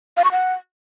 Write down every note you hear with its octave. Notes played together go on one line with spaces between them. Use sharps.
F5
C#6
F#5